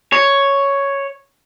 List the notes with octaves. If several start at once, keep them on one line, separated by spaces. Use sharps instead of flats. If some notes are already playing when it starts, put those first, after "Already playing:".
C#5